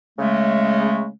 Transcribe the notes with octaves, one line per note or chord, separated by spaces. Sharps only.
C#3 G#3 A3